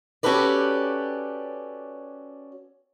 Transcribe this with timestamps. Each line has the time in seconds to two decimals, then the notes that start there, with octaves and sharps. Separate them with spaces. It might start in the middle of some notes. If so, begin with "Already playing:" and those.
0.23 C#4 F#4 G4 A4 B4 D5